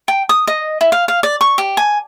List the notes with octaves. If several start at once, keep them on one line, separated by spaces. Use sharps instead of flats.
G5
D#6
D#5
E4
F5
F5
D5
C#6
G4
G#5